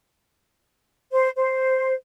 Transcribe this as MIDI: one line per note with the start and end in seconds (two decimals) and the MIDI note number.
1.12 1.29 72
1.36 1.93 72